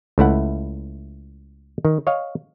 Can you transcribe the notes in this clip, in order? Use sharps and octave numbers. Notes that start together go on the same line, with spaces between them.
C#2 A3 E4 F#5
D#3
C#5 D#5 F5